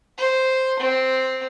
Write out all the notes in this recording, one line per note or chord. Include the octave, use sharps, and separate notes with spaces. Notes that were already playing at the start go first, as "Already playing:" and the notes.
C5
C4